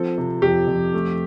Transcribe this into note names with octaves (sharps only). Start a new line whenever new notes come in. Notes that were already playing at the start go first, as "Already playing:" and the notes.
Already playing: F3 C4 A4
C3
F2 G4
F2
A3